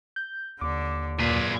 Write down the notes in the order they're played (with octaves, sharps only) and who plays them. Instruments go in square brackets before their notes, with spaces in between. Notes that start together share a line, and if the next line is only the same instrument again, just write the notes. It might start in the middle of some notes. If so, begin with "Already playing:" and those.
[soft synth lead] G6
[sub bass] D#2 [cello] D3 [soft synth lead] D6
[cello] F#2 A#2 [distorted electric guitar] G#4 B4